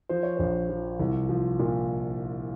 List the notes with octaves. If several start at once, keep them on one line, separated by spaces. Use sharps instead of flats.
F3 C5
C#5
A#1 C5
F3
C2
F3
A#2